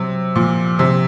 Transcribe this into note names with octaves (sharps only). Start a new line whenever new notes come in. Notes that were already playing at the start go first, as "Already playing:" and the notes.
Already playing: C3 F#3
A#2 F3
C3